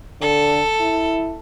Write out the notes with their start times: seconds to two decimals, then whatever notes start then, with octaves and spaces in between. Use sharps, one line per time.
0.21 D3 A4
0.80 E4